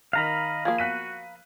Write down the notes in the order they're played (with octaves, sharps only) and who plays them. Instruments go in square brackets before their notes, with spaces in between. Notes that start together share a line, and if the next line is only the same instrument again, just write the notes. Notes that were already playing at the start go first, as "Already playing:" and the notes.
[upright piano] D#3 F6 [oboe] D#5 [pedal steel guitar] F5 A#5 B5
[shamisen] F3 A#3 [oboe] G#4
[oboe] F#4 [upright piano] F#6 B6 D#7